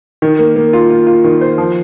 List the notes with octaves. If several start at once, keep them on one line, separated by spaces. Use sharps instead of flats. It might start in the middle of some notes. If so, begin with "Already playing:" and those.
D#3
A#3
A#3
F4
F4
F4
D#3
C5
F3